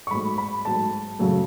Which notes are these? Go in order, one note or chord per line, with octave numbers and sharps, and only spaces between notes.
C#6
G#2 F#3 A3 B5
B5
G#2 F#3 A3 A5
F#2 C#3 F#3 A3